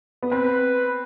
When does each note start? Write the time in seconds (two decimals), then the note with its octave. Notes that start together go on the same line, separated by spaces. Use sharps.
0.23 B3
0.31 C4 B4